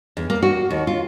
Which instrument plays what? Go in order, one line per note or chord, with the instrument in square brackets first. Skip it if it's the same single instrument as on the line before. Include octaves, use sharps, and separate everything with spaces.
[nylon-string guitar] E2
A#3
F#4
D#2
F4